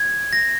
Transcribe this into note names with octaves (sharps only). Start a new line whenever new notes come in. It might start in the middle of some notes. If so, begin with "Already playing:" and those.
Already playing: G#6
A#6